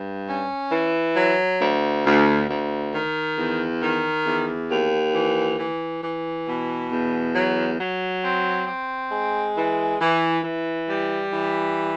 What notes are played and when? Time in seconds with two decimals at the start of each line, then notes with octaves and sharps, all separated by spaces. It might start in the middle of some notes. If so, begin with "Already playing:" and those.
Already playing: G2
0.29 C#4
0.72 E3
1.16 F#3
1.60 D2
2.06 D2
2.49 D2
2.94 D#3
3.37 E2
3.82 D#3
4.26 E2
4.70 D#2
5.14 E3
5.58 E3
6.02 E3
6.47 B2
6.90 E2
7.35 F#3
7.80 F#3
8.24 C4
8.67 C4
9.11 G#3
9.56 E3
10.01 E3
10.44 E3
10.88 G3
11.32 E3